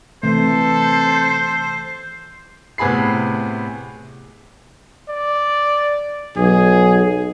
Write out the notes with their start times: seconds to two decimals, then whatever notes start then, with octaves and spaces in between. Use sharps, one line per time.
0.23 C3 E3 A3 A4 C5
2.78 A2 C3 B3 G#4 B5 C7
5.08 D5
6.37 B1 G#4